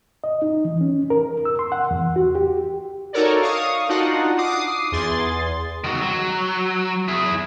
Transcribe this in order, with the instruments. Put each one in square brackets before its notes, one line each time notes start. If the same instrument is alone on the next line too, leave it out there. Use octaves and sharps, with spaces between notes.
[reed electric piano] D#5
D#4
E3
C#4
A#4
E6
C6
F#5
E2
F#4
G4
[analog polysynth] D#4 F#4 A4 A#4 C#5 D5
F5 C#6 D#6
D4 D#4 F4 F#4 F#5
D6 D#6 C7
E2 G#4 C6 A6
[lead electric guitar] D#3 F#4
F#3
E4 G#4